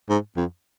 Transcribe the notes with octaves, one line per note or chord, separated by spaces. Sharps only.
G#2
F2